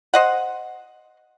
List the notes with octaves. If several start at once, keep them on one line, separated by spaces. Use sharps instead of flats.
C5 D#5 F#5